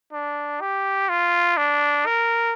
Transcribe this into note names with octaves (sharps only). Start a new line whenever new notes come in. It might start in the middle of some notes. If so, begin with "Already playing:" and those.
D4
G4
F4
D4
A#4